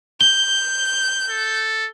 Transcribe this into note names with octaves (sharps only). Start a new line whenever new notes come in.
G6 G7
A4